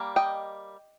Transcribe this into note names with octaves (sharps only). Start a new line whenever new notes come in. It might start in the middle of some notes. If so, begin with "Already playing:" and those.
Already playing: G3 A#3
D#5 G5